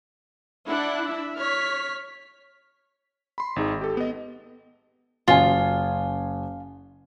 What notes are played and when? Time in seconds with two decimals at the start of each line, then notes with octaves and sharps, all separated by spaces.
0.68 D4 E4 F#5 F#6
1.05 E5
1.37 C#5 F6 B6
3.38 B5 C6
3.56 G#1 D#4 G#4
3.81 G4 A4
3.97 B3 D#5
5.28 F#1 F4 G#5